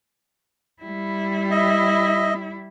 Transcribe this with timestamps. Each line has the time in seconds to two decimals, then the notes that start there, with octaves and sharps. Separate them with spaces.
0.83 G3 E4
1.51 D#5 E5